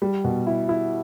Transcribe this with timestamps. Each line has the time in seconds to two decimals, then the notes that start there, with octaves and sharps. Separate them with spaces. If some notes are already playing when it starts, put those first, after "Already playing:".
0.02 G3
0.24 B2
0.47 E4
0.69 E4